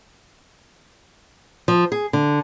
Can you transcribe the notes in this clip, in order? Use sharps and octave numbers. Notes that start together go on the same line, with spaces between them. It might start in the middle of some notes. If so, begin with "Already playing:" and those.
F3
G#4
D3